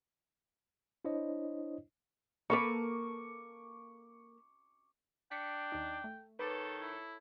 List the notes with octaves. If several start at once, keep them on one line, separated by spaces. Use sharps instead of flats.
D4 E4 C5 C#5 D#5
A#3 A4 B4 C#6 D6
D4 G5 B6 C#7
D#2 D#4
A3
D#3 A4 B4 C#5 D6 A6
E4